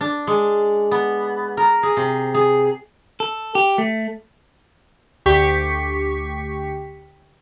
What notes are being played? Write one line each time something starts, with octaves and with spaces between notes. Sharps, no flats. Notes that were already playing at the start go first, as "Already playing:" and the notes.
D4
G#3
B3
A#4
G#4
C3
G#4
A4
G4
A3
D2 G4 C#6 B6